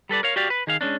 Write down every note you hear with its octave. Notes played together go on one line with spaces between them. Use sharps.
G3 A4 B4 D5
A#4 C#5 F5
F#4 G4 D5 F5
B4
D#3 G#4 F5
G#3 A3 C#4 D4